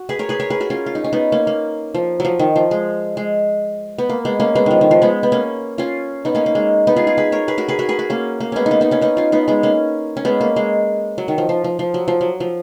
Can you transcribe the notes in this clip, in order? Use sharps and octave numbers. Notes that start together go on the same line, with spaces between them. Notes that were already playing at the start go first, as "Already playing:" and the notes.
Already playing: F#4
G#4 B4
A#4 C#5
G#4 B4
A#4 C#5
G#4 B4
F#4 A#4
C#4 F4
F4
D#4
C#4
B3 D#4
A#3 C#4
A#3
F3
F3 F#3
D#3
F3
G#3
G#3
B3
A#3
G#3 B3
A#3 C#4
G#3 B3
D#3 F3
D#3
F3
G#3 B3
B3
A#3 C#4
C#4 F4
B3 D#4
A#3 C#4
A#3
G#3
B3 D#4
F4 G#4
F4 G#4
G#4 B4
A#4 C#5
G#4 B4
F#4 A#4
G#4 B4
F#4 A#4
G#4 B4
F#4 A#4
A#3 C#4
A#3
G#3 B3 C#4
D#4
A#3 C#4
B3 D#4
A#3 C#4
B3 D#4
C#4 F4
B3 D#4
G#3 B3
A#3 C#4
C#4
G#3 B3
A#3
G#3
F#3
D#3
F3
F3
F3
F3
F#3
F3
F#3
F3